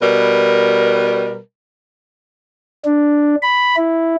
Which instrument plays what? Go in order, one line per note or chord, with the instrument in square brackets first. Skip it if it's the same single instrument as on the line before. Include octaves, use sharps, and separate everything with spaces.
[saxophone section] B2 G3 A#4 B4
[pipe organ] D4
B5
E4